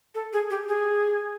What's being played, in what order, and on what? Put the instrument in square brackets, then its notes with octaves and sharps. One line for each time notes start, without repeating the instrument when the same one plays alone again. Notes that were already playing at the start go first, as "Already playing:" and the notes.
[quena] A4
G#4
G4
G#4